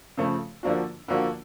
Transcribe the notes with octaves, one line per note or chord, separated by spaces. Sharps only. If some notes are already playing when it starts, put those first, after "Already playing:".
C#3 F3 A3
D3 F3 A#3 D4 F#4
D3 F3 A#3 D4 F#4